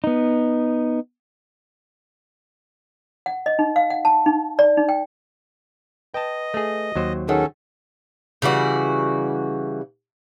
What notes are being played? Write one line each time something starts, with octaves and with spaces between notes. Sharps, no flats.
B3 D#4
F#5
D#5
D#4
F5
F#5
A5
D#4
D5
D#4
G5
B4 D#5 G5 A5
A3 G#4
D#2 F#3 C5
D#3 C#4 G#4 A4 C#5 F#5
C#3 E3 G3 F#4